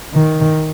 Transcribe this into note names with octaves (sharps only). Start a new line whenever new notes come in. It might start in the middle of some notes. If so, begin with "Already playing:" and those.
D#3